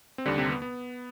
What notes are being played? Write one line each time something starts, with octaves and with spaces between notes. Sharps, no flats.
C4
D#2 D3 G3 D4
C3 C4
B3
B3